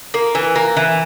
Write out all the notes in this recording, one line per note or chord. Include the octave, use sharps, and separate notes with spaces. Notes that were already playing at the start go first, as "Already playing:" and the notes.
A#3
E3
A#3
E3